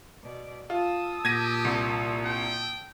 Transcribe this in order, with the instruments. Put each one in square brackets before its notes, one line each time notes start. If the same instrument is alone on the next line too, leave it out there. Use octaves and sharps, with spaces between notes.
[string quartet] B2 D5
[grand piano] F4 [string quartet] A5 D#6 E6
[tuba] A#2 [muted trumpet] G4 [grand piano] G#6 A#6 D#7
[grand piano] C2
[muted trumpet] G5